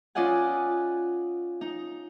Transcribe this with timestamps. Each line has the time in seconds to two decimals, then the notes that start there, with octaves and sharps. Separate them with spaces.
0.15 C#4 F4 D5 D#5 F#5 G#5
1.61 D#4